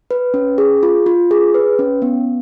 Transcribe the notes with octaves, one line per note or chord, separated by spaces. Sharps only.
B4
C#4
G#4
F4
F4
G#4
B4
C#4
B3